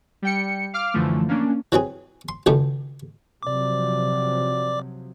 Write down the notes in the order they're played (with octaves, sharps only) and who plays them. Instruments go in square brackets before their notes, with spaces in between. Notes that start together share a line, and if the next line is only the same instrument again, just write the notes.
[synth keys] G3 G5 C#7
F5 D6 F6
F#2 D3 E3 F3 A3
A#3 C#4 D4
[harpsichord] E3 F#3 C4 G#4
C6
C#2 F#2 D#3 A3
[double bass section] C3 F3 F#3 [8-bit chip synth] D5 D6